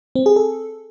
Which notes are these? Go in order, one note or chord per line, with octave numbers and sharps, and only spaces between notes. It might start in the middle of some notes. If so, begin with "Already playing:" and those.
C4
G#4
A4